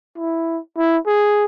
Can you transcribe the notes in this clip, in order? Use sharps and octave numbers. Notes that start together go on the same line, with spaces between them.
E4
E4
G#4